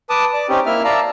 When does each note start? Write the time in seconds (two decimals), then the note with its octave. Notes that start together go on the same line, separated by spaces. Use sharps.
0.10 B4 A5 D6 D#6
0.34 D5 D6
0.49 C4 C#4 D#4 G4
0.66 A#3 E4 E5 F6
0.85 D5 F5 A5 A#5 E6